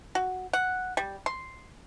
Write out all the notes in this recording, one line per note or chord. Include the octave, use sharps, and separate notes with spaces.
F#4
F#5
G3
C6